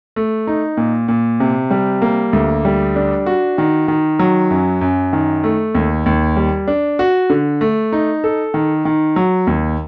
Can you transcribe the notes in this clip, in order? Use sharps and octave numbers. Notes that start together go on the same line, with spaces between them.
A3
D#4
A#2
A#2
C3
G3
A#3
D2
G3
D4
F#4
D#3
D#3
F#3
F#2
F#2
D#3
A3
D#2
D#2
G3
D4
F#4
D3
A3
D#4
A4
D#3
D#3
F#3
D#2